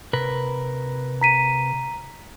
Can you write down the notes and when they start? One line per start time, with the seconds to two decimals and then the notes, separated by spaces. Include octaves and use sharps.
0.13 C3 A#4 B4
1.21 A#5 B6 D#7